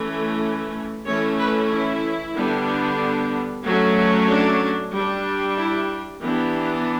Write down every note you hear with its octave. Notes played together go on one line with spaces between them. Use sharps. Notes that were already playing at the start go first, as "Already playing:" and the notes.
Already playing: E3 A3 C#4
E3 A3 C#4 C#5
B4
E4
D3 G3 B3 D4
F#3 A3 C#4
D4
G3 D4
E4
E3 B3 D4 G4